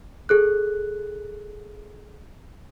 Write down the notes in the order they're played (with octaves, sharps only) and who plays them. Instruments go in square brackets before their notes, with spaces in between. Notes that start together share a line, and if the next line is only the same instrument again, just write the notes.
[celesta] G#4 A4 F#6